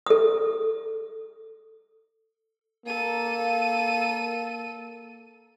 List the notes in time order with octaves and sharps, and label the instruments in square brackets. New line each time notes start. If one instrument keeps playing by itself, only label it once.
[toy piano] A4 D#6
[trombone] A#3 [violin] A4 D#7